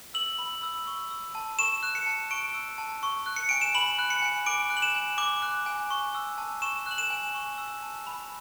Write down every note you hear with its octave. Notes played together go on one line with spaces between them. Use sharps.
E6 F#7
B5
E6
C#6
E6
A5
C#6 E7
F#6
C#7
A5
C#6 D7
E6
A5
C#6
F#6
C#7
G#5 D7
E7
B5 F#7
F#6
C#7
G#5
D6 D7
F#6
F#7
E7
G#5
D6
F#6
G#5
C#6
E6
A5
C#6 E7
F#6 F#7
E7
G#5
C#6
E6
A5
B5